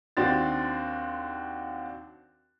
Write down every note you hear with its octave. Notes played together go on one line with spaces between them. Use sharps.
D#2 C4 D4 F#4 C6 A6